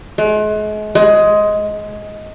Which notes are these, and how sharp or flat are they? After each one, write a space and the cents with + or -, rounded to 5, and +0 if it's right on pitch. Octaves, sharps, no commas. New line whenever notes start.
G#3 +40
G#3 +10